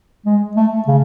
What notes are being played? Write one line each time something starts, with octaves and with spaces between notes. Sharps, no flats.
G#3
A3
C#3